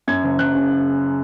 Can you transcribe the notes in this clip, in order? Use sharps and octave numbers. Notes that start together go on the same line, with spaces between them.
F#2 G#6
F#1
F#1 F#6
C#3